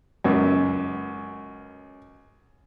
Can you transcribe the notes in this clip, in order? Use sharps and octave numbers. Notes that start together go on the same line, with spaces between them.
C#2 F#2